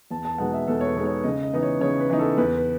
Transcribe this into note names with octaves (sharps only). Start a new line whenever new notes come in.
E2 A5
A5
B2 G#3 B3 D#4 F#5
E5
E2 A4
C#5
B4
B2 G#3 B3 D#4
C#5
C#3 D#5
D#5
E3 B3 D#4
C#5
C#3 C#5
B4
E3 B3 D#4
A4
E2 B4
B4